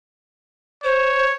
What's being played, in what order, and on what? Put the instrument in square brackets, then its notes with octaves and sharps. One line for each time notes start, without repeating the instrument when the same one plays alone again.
[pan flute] C5 [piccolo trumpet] C#5